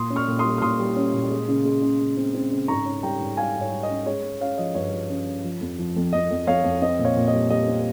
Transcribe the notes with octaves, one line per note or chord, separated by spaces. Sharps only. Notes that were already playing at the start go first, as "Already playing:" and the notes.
Already playing: A#2 C6 D#6
C#4
C#6 F6
A#2
C6 D#6
G3
F6
A#2 C6 D#6
G3
C#4
A#2
G#3
C#3
G#3
C#3
C#3
C4
C4
C#3
G#2 A#5 C#6
C#4
G3 G5 A#5
G#2
G3 F5 G#5
G#2
C#5
G3
D#5
C#4
G#3 C#5
G#3
C#4 C#5 F5
F3 D#5
G2 C#5
F3
C#4
C#4
F3
F2
F3
F2
F2 D#5
F2
F2 C#5 F5
F2
C4 D#5
A#2
C#5 F5
A#2
G3 D#5
G3 D#5
C4